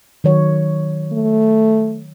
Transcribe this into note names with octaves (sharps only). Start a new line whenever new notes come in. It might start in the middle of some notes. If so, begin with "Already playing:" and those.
D#3 F#3 C#5
A3